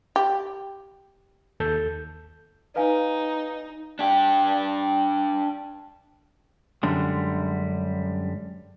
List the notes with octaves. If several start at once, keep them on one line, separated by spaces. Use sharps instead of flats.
G4
D#2 A4 G6
D#4 B4 F5 G#5
D4 G4
F#2 D3 G3 G#3